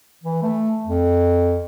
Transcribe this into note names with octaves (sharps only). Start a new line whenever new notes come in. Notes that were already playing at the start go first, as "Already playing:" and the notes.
E3
A3
F2